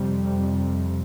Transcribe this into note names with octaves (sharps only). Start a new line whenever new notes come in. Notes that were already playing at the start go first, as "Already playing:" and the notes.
Already playing: F2 C3 G3